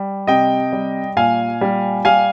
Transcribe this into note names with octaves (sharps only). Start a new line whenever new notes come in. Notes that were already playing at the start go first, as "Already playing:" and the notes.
Already playing: G3
C3 D#5 G5
G3
A#2 F5 G#5
G3
G3 F5 G#5